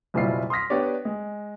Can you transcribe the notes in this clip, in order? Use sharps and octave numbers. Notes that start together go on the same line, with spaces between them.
F#1 B2 G3 E4 F4 C7
C6 D#6 F6 A#6 B6
B3 D4 G4 C#5 D5
G#3